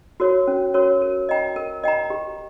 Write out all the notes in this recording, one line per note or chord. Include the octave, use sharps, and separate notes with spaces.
F#4 A#4 C#5
C#4
F#4 A#4 C#5
A#4
D#5 G5 A#5
A#4
D#5 G5 A#5
G4